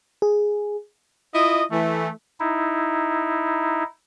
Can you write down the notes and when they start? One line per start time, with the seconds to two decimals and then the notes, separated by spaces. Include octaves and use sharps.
0.22 G#4
1.35 E4 F4 D#5
1.72 E3 A3
2.40 D#4 E4